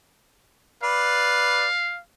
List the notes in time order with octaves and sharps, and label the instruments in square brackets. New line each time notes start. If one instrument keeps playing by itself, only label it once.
[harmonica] B4 D5 [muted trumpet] F5